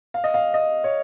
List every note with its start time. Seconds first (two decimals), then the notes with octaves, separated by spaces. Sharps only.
0.14 F5
0.24 D#5
0.34 F5
0.54 D#5
0.84 C#5